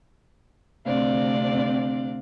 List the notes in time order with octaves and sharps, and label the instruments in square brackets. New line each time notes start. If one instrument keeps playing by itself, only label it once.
[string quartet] D2 C3 C4 D4 D5 F5